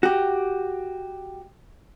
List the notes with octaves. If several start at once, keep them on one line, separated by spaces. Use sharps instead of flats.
F#4 G4